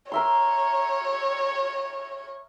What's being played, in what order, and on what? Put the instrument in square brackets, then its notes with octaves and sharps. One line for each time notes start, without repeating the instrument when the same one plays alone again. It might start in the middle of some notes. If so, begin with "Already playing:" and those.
[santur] A#4 E5 C6 [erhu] C#5